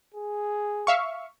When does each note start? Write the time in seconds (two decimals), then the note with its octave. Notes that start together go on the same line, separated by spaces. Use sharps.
0.14 G#4
0.87 E5 F5 C#6